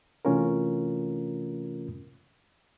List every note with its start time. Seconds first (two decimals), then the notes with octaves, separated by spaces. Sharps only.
0.25 C3 E3 A3 C#4 F4 A#4